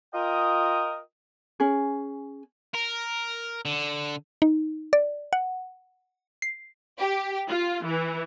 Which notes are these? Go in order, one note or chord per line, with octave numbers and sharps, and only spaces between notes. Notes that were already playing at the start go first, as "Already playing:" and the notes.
F4 A#4 D#5 G5 D#6
C#4 G#4
A#4
D3
D#4
D5
F#5
C7
G4
F4
E3